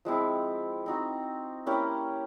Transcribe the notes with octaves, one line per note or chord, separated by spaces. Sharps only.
F3 G#3 C4 E4
C4 D#4 F#4
A#3 C#4 E4 G4